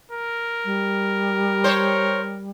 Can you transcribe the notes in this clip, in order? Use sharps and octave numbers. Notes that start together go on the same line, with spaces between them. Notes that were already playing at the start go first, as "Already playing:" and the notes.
A#4
G3
C5 C#5